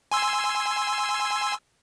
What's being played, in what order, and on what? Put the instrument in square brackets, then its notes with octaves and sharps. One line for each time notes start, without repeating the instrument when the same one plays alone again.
[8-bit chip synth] G#5 C6 E6